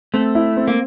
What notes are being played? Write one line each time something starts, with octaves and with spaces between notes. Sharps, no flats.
A3 C4
E4
C4
A#3